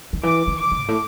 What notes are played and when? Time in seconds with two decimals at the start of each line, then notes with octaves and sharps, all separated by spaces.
0.13 D#3
0.23 E3 D6
0.47 D#3
0.60 D6
0.72 D#3
0.80 G#2
0.88 A2